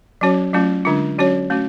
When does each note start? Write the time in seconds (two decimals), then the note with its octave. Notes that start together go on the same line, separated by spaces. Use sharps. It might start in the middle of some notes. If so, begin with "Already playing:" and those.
0.21 F#3 C#4 F#4 C#5
0.53 F#3 A3 C#4 F4
0.85 D3 G#3 D4 F4
1.18 F#3 C#4 F#4 C#5
1.50 A3 C#4 F#4